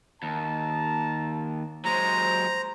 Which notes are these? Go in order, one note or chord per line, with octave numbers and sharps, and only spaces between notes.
D#2 A5 A#5
F#3 G#3 C5 A#5